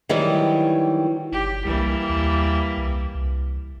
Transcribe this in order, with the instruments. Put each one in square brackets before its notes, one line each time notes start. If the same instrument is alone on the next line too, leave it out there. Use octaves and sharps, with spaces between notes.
[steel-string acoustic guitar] D#3 E3 F#3 G3
[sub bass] G1 [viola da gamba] G4
[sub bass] C2 [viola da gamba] E3 G3 A#3
[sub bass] D#2
C2
C2